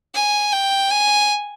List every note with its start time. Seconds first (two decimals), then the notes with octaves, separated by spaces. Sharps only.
0.14 G#5
0.52 G5
0.90 G#5